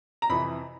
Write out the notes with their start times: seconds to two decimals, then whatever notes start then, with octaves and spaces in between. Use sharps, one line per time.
0.22 A#5
0.30 F2 C3 E3 B5